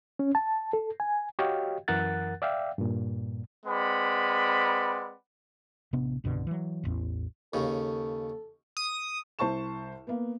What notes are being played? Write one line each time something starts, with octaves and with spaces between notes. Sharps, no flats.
C#4
A5
A4
G#5
F#4 G4 C#5 D#5 F5 G5
F#2 E3 A#4 F#5 F#6 A6
D5 E5 F5 G5
G2 A#2
G#3 C4 B4 D5 F#5 B5
A1 C3 B3 D4
C2 G2 B2 D3
E3 F#3
E1 A1 E2
D#2 C#3 A4
D#6
C2 C5 A5 C#6 E7
A#3 B3